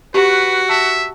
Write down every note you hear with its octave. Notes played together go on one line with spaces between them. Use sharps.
F#4 G4 B4
E5 A5